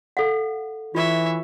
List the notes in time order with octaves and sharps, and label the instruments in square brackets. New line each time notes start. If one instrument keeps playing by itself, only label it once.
[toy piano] A4 F5 F#5
[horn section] E3 [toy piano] F4 [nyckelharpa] C#5 E5